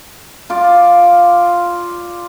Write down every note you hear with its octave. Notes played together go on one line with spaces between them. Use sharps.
F4 D5